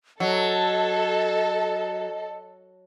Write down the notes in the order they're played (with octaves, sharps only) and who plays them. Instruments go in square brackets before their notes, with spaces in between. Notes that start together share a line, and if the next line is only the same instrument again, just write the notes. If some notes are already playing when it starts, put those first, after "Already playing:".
[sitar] F#3 [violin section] A4 [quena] D#5